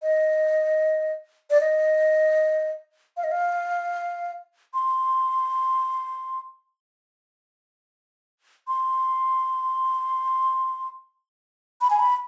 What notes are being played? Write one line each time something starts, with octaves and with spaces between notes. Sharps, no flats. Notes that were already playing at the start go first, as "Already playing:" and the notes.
D#5
D5
D#5
F5
D#5
F5
C6
C6
B5
G#5
B5